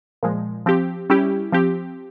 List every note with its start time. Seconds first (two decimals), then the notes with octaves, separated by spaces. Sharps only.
0.23 A#2 F3 G#3
0.66 F3 C4 G4
1.10 G3 C#4 E4 G4
1.52 F3 C4 G4